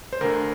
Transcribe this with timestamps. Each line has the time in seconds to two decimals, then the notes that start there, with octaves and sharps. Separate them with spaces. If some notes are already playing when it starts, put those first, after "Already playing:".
0.13 C5
0.21 D2 D3 A#4